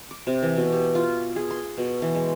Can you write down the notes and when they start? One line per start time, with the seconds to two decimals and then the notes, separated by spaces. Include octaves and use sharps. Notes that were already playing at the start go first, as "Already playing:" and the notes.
0.11 D6
0.27 C3
0.42 E3
0.57 B2
0.72 G4
0.95 F4
1.36 G#4
1.51 C6
1.78 B2
2.02 E3
2.15 G#3